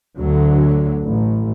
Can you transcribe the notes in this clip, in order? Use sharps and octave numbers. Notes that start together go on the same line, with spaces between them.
D2 D3 F#3
A1